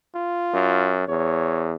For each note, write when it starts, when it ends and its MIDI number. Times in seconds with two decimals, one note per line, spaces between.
0.15 0.97 65
0.54 1.07 42
1.09 1.75 40
1.09 1.67 73